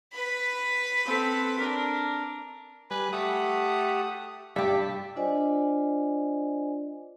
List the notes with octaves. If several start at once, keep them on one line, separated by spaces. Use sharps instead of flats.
B4 B5
C4 A4
D4 A#4
G3 B4 G#5
A3 G4 F#5 D#6
G2 G4 D5 E5
D4 F4 C5 D5 D#5 G#5